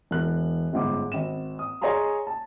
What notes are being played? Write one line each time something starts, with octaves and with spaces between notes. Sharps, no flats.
E1 F#6
G1 G#2 D6
G#1 E7
D#6
G#4 C#5 D#5 G#5 A#5 C6
A5